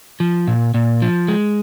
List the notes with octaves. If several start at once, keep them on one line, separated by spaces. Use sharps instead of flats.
F3
A#2
A#2
F3
G#3